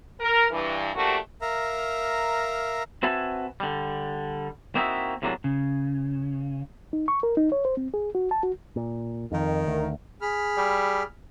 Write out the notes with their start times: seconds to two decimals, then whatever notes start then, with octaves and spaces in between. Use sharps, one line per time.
0.20 A#4
0.51 G2 E3
0.95 F3 A3 A#3 D4 F#4 G4
1.41 A#4 E5 F5 A#5
3.03 C4 F#4 B4 E5 G#5 A5
3.60 D3 G3
4.75 A#3 C4 D#4 E4 F#4 E5
5.22 A2 C3 E3 F#3 A#3 D4
5.44 C#3
6.93 D#4
7.08 C#6
7.23 A#4
7.37 D#4
7.52 C#5
7.65 C5
7.77 C4
7.94 G#4
8.15 F#4
8.31 A5
8.43 F#4
8.76 A#2
9.32 F2 D#3
9.67 D2
10.22 G#4 B5 F6
10.57 G3